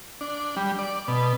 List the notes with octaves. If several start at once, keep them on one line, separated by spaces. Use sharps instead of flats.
D4
G3
D5
B2